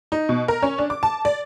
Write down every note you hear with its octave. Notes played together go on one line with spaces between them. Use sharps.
D#4
B2
A#4
C#4
D4
D6
A5
D5